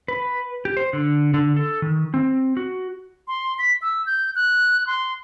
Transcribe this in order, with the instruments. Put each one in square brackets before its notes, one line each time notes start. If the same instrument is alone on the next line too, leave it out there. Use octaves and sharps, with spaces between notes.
[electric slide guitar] B4
G4
C5
D3
D3
A4
D#3
C4
F#4
[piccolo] C6
B6
E6
G6
F#6
C6